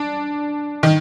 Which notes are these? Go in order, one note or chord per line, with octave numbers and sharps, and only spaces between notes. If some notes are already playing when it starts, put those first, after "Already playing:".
Already playing: D4
D#3